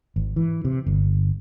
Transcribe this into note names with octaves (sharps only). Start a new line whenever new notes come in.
G#1
E3
C3
G1